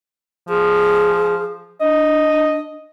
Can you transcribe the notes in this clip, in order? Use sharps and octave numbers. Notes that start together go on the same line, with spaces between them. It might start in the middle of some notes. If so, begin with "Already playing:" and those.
F3 G#4
D4 D#5